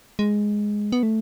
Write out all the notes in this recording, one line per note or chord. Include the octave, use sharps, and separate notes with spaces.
G#3
B3
A3